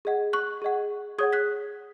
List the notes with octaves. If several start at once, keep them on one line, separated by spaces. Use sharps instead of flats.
G#4 D#5 F#5
C#6 F#6
G#4 D#5 F#5
G#4 C#5 F#5 D#6 G#6
F#6 B6